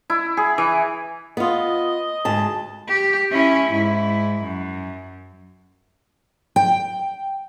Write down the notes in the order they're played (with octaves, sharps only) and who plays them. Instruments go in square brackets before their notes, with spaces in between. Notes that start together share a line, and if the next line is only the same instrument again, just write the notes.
[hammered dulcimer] E4
G#4
E3
[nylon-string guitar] B3 F4 [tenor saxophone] D#5
[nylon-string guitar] D2 G#2 A5
[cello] G4
C#4 E4
G#2 E4
F#2
[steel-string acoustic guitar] G5